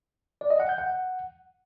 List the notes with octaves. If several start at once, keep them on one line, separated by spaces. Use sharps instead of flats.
D5
D#5
F#5
G6
F#5